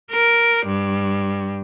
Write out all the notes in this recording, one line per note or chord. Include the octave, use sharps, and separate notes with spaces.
A#4
G2